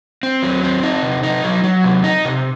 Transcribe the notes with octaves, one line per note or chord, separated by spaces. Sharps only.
C4
F#3
C4
D#4
C3
D#4
F#3
F#3
C3
D#4
C3